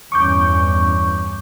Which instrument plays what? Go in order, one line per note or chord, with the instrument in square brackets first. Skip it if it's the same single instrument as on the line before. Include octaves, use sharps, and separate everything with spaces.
[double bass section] E2 G2 C#4 [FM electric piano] C#6 D6 G6